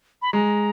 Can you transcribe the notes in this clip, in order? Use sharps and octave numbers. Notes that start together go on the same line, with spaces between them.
B5
G#3 A#5